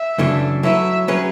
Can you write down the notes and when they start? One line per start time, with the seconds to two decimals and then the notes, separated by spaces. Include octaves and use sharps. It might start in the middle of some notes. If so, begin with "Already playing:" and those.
Already playing: E5
0.18 F#2 C#3 E3 A3 D4
0.63 F#3 A3 E4 B4 E5
1.08 F#3 C#4 G#4 B4